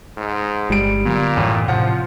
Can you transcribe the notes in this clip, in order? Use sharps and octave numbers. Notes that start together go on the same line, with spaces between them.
G#2
G1 G3 G#3 D7
A#2 D3 F#3 B3
A1 F#2 A2
A2 C3 F3 F#5